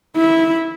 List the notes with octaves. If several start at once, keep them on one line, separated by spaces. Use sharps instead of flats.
E4